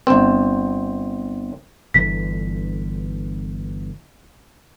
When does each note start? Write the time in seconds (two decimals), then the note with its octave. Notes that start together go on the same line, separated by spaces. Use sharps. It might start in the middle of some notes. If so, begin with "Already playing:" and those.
0.07 G1 C4
1.94 G1 D3 E3 B6